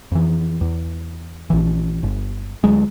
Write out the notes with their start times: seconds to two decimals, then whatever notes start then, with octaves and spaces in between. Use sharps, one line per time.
0.12 F2 E3
0.61 E2
1.50 A#1 E3
2.03 G1
2.64 D2 F#3 G#3